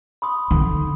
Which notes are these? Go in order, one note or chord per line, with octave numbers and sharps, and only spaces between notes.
B5 C6 D#6
D3 D#4